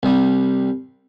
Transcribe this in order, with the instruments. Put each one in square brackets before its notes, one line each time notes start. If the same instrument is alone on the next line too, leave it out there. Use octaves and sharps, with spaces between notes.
[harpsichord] C2 G3